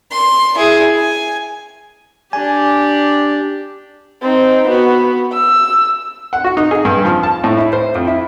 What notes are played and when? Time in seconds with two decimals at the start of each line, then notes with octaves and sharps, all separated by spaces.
0.12 C6
0.56 E4 G#4
0.96 G#5
2.33 D4 G4 G#5
4.22 C4 D#4
4.68 B3 F#4
5.33 E6
6.33 F#5
6.44 F#4
6.57 D#4
6.71 G#4
6.85 G2
7.05 F3
7.23 A5
7.44 A2
7.57 E4
7.73 C5
7.95 F2
8.07 E4